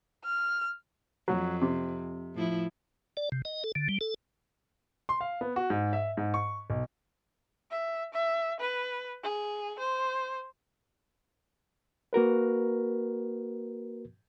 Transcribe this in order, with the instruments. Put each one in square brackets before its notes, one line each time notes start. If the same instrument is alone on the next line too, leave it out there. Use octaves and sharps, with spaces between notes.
[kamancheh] F6
[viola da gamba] F2 [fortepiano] F#3
[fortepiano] C3
[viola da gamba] A2 F3 E4
[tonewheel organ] D5
C3
D#5
A4
D3
G3
A4
[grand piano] C6
F5
B3
F#4
G#2
E5
G#2
C#6
B1
[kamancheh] E5
E5
B4
G#4
C5
[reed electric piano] A#3 F#4 A#4 B4